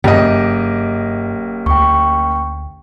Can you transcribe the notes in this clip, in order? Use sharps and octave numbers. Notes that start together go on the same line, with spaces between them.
F#1 G2 G4 D#5
D2 G5 C#6